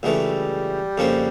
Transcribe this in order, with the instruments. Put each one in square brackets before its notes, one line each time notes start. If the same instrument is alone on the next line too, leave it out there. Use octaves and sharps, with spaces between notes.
[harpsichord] C#2 C#3 E3 A3 [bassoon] G3
[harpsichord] F2 C#3 F3 A#3 C#4